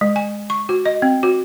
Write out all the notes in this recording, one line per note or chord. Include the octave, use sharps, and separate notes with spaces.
G#3
G#5
C#6
F#4
D#5
C4
F#4